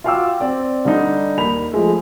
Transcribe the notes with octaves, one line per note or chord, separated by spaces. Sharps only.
F4 F#4 F5 G5 D6 E6
C4 D5 G5
D3 G3 D4 D#4
D#2 A#4 B5 F7
F3 G#3 A3